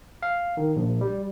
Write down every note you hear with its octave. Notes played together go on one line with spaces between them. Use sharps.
F5
D#3
A#1
G3